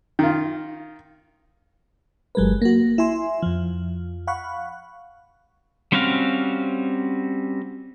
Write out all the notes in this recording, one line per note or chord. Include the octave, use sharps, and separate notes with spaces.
D#3 F4
G1 F#3 G#3 A#4 B4
A#3 F#4
E4 E5 G#5 C6
F2 F3
F5 F#5 B5 C#6 F#6
G3 C4 C#4 F#4 F5